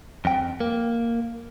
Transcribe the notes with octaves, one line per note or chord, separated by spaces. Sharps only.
F2 G5
A#3